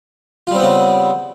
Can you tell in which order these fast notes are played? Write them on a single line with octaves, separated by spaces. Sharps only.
F4 G3 C4 B3 C#3